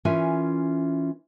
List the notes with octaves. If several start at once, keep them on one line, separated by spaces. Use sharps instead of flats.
E3 C#4 F4 A#4 E5 G#5